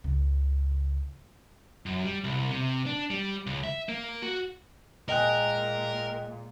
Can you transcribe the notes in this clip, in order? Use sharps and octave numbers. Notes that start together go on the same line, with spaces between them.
C#2 C#3
F#2
G3
C2
C3
D4
G3
C#2
E5
A#3
F#4
A#2 G#3 A#4 D#5 G5 F#6